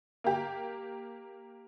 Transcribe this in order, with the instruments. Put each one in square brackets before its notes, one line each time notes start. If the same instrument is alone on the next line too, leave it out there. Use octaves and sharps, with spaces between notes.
[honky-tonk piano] A#3 G4